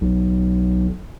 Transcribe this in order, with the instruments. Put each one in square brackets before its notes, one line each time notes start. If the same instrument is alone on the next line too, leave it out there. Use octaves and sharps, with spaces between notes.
[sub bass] B1